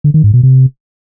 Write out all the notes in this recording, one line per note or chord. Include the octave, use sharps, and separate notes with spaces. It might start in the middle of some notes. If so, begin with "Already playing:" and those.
D3
D#3
G#2
B2
C3